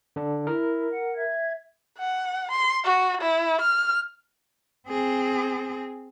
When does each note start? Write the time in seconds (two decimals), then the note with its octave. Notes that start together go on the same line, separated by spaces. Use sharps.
0.16 D3 D4
0.47 E4 A#4
0.90 F#5
1.15 E5 G#6
1.99 F#5
2.51 C6
2.84 F#4
3.22 E4
3.61 F6
4.87 C4 G#4